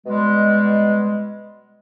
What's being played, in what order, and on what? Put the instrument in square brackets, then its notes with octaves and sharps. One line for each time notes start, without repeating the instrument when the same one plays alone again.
[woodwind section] B2 G3 G#3